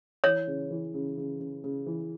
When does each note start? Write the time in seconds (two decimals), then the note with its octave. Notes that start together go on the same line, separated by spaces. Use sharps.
0.24 E3 C#5
0.47 C#3
0.71 E3
0.94 C#3
1.17 C#3
1.40 C#3
1.64 C#3
1.86 E3